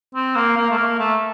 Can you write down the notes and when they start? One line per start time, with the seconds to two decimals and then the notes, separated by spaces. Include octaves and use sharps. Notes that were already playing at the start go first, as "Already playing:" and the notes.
0.14 C4
0.35 A#3
0.56 A#3
0.70 A3
0.78 A#3
0.99 A3